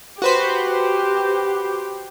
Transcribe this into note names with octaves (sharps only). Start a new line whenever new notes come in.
F#4 G4 B4 C5